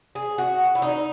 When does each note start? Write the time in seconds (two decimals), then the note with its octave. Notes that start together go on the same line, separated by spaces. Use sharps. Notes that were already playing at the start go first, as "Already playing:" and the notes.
0.15 G#4
0.38 F#4
0.75 E4
0.82 D#4